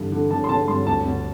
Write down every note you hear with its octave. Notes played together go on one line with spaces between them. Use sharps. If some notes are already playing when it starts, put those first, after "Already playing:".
Already playing: G2 D3 E3
D3
D3 A5
C6
D3 A5
G2 C6
D2 A5
D2